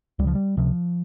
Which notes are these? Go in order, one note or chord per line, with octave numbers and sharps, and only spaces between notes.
C#2 G3
C#3 F3
G3
C#2 C3 F3